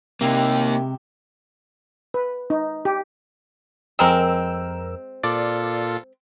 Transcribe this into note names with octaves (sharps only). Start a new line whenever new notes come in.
C3 G#3 A#3 D#4 E4 G4
B4
D#4
G4
F2 G#3 C4 A#4 E6
A#2 F4 A4 D5